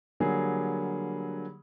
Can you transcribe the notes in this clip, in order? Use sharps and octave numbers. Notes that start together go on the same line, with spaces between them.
D3 F#3 G3 A#3 G#4